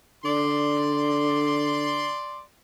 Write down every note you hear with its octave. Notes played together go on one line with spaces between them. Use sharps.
D3 D5 C6